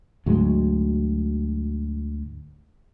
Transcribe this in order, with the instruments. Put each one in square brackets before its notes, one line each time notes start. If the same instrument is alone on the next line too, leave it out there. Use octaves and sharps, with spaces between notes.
[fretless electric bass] D2 G#2 F#3 G#3